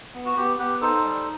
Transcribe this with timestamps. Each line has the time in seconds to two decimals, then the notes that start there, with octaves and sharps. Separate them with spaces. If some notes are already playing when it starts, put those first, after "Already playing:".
0.14 B3
0.25 F#4
0.37 B3 G4
0.59 B3 G4 B4
0.81 D#4 A4 C5
1.04 G3